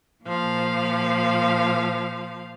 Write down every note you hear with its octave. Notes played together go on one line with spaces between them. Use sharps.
A#2 F3 F5